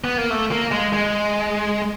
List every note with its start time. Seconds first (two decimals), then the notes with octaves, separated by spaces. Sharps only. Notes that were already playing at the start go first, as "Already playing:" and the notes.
0.04 B3
0.18 A#3
0.30 A3
0.52 A#3
0.72 G#3
0.93 G#3